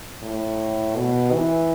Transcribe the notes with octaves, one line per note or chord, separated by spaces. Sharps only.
A2
B2
E3